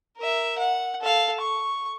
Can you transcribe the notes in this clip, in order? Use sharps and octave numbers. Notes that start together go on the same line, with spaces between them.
A#4 E5
F#5
A4 F5
C#6